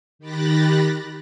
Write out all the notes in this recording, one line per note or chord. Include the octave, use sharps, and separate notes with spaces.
D#3 G4 B5 F#6 A6 A#6